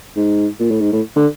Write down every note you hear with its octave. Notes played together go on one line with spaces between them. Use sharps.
G#2
A#2
A2
G#2
A2
D3